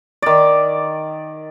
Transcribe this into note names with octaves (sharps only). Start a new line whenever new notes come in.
D#3 D5